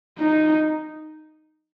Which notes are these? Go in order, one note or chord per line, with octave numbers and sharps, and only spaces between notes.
D#4